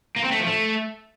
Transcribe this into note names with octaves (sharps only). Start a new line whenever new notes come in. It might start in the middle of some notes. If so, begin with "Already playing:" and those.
A#3
C4
A3
F3
A3